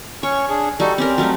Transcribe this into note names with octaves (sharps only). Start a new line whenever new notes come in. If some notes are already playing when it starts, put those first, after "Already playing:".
C#4 C#5 C#6
D4 G#4
G3 D#4 F#4 A4
C4 C#4 G4 A#4
D2 F#3 A3 C#4 D#4 G4